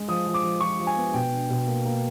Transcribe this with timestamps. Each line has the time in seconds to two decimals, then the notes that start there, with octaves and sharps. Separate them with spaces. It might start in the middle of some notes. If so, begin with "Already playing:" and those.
Already playing: G#3
0.08 F3 D#6
0.26 F3
0.34 D6
0.43 F3
0.60 F3 C#6
0.79 F3
0.87 G#5
0.96 B3
1.14 B2 G5
1.32 D4
1.50 B2
1.67 A#3
1.85 A#3